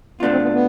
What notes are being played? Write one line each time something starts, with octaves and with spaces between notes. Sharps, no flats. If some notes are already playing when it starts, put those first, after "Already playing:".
B2 A3 B3 D4 F4
C4
B3
B3